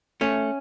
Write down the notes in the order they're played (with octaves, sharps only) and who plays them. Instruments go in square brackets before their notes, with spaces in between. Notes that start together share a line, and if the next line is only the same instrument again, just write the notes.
[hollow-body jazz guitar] A3 C#4